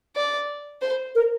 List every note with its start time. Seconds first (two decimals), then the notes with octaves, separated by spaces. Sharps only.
0.16 D5
0.82 C5
1.15 A#4